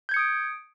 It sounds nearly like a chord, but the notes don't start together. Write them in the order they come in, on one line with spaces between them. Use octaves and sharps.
G6 G#6 C#7 D#6 D7